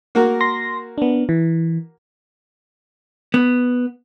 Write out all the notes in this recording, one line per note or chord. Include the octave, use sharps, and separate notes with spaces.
A#3 F#4 A#4
C6 A#6
B3 D4
E3
B3